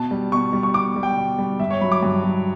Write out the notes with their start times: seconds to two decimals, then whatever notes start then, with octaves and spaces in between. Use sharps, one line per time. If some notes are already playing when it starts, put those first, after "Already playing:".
Already playing: B2 A5
0.11 G3
0.32 B2 C#6
0.53 G3
0.63 C#6
0.74 B2 D6
0.96 G3
1.03 G5
1.17 B2
1.39 G3
1.59 G2 E5
1.70 C#5
1.81 F#3 B5
1.92 D6
2.03 G2
2.24 F#3